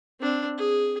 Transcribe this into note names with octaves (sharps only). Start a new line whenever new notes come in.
C4 D4
G#4